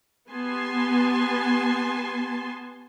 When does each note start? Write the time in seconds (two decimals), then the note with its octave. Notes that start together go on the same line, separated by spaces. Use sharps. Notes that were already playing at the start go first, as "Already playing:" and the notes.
0.30 B3 G4 G#5 A5 C6